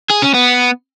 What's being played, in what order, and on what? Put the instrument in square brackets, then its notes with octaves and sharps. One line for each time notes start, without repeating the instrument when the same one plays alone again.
[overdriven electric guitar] G#4
C#4
B3